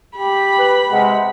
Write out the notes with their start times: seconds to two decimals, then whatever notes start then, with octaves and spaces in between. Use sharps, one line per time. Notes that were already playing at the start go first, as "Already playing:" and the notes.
0.18 G4 B5
0.58 B4
0.91 C3 G#3 F#5